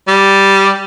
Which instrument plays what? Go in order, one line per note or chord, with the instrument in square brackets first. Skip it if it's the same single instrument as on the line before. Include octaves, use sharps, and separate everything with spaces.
[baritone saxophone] G3